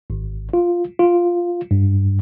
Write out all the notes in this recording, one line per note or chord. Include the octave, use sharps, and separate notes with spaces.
G#1
F4
F4
G2